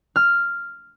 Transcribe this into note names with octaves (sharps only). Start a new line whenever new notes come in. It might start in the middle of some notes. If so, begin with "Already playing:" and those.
F6